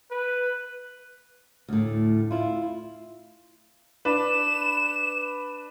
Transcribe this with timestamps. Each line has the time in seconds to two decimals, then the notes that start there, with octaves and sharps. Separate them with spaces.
0.11 B4
1.68 D2 A2
2.31 E4 F4
4.05 D4 B4 E7